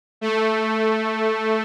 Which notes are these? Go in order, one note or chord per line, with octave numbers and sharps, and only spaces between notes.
A3